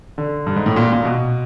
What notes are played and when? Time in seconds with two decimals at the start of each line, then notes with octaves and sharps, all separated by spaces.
0.18 D3
0.46 G2
0.56 G#2
0.66 A2
0.76 A#2
0.93 A#2
1.05 B2